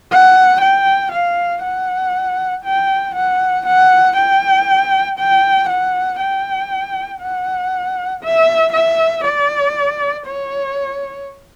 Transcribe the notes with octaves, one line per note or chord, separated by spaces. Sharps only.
F#5
G5
F5
F#5
G5
F#5
F#5
G5
G5
F#5
G5
F#5
E5
E5
D5
C#5